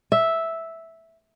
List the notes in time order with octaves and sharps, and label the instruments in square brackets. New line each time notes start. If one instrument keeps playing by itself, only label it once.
[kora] E5